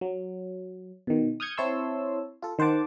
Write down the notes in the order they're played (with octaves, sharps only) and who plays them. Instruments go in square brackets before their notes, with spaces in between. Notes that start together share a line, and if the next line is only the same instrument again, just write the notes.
[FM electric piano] F#3
B2 D#3
D#6 F6 G6 G#6 C#7
C4 E4 C#5 A5 C6 E6
F4 A4
D#3 C5 F#5 A5 D6